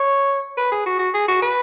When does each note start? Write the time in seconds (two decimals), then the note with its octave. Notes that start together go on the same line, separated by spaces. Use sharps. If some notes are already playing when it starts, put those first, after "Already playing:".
Already playing: C#5
0.58 B4
0.72 G#4
0.86 F#4
0.99 F#4
1.14 G#4
1.28 F#4
1.42 B4